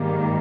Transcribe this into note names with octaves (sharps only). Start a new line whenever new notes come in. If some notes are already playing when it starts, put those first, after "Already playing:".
Already playing: G#2 D#3 G3 A#3